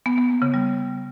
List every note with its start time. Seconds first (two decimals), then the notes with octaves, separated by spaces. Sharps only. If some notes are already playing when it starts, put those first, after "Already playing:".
0.06 B3
0.18 B3
0.30 A#3
0.42 C#3
0.54 G3